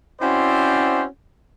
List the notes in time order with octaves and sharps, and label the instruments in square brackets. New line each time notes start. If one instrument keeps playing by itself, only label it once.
[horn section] C4 C#4 E4 F#4 C5 D5